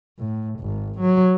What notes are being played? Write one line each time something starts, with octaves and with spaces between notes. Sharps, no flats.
A2
G#1
F#3